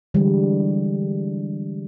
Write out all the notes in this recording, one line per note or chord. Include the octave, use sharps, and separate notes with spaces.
D3 E3 G3 G#3